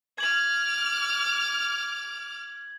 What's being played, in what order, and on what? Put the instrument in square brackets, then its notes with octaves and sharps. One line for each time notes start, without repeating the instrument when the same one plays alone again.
[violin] D6 F6 [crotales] G#6 F#7